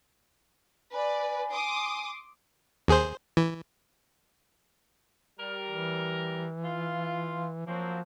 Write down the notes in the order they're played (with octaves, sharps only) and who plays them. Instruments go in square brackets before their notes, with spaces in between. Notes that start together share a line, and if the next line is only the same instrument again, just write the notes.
[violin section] B4 D5 [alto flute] G#5
[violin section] C6 D6 D#6
[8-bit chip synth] D#2 G#4 C5
E3
[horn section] G3 A#4
[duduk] E3
[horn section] F4
[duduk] F3 [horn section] F#3 A#3 C4